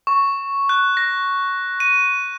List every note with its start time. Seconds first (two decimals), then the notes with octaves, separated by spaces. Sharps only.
0.07 C#6
0.69 F#6
0.97 A#6
1.80 D#7